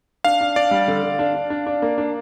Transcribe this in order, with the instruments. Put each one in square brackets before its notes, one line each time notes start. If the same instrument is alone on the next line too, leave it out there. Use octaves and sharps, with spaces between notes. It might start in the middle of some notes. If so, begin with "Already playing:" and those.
[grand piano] D4 [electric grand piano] F5
[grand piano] D4
[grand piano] D4 [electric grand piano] D5
[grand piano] G3
D3
D3
D4
D4
D4
D4
A#3
D4